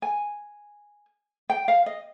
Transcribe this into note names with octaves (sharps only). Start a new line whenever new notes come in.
G#5
G5
F5
D#5